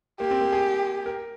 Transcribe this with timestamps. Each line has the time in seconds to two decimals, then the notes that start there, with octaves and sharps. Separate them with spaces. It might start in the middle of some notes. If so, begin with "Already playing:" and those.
0.20 A#3 G4
0.31 C4
0.41 A#3
0.52 G#4
1.06 A#4